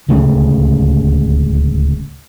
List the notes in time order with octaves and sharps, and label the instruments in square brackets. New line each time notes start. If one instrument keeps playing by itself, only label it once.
[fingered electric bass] D1 C#2 C#3 A3